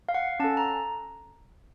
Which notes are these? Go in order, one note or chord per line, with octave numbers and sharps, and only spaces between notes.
F5
F#5
C#4 A4 A5
A#5